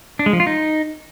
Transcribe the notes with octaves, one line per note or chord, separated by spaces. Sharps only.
D4
G#3
F3
F4
D#4